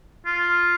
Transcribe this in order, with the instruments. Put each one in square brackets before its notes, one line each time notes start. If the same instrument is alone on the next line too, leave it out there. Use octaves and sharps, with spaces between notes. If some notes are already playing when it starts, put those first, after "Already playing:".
[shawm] F4